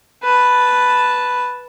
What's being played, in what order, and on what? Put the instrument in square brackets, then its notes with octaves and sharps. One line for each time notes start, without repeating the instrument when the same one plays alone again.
[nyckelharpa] B4 A5